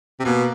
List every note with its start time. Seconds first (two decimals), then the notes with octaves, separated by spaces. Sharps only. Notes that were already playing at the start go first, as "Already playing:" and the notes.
0.20 C3
0.24 B2 A#3